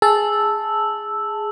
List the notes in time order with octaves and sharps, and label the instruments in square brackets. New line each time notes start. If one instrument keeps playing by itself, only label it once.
[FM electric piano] G#4 A5 [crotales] E6